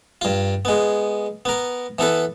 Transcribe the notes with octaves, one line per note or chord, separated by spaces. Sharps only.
G2 F4
G#3 B3
B3 A#4
E3 B3 A4 B4